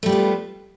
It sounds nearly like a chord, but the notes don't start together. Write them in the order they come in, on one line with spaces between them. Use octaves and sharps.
A3 G3 F4 B3